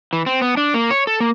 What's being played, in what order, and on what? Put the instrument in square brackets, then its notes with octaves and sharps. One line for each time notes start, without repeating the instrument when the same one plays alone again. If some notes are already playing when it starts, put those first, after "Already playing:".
[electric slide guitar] E3
C4
B3
D4
A#3
C#5
A4
A#3